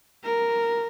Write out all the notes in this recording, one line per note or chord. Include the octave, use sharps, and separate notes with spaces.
A#4